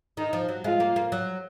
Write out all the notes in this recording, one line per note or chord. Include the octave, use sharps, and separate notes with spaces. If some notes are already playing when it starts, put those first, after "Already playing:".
D#3 D#4
F3
F#3
G#3 F4
A#3
A#3
F#3